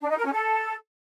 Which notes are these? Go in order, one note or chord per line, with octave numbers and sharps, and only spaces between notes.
D4
D#4
A#4
C#4
A4